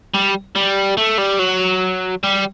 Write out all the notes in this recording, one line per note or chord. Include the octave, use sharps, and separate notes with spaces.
G3
G3
A3
G3
F#3
G3